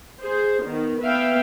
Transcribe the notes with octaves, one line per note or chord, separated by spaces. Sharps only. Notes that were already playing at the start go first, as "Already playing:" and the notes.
G#4 C5
D#3 B3
B3 B4 E5 F5 G5